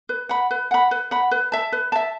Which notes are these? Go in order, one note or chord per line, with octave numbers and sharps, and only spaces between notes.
B4
F#5 B5
B4
F#5 B5
B4
F#5 B5
B4
E5 A5
B4
E5 A5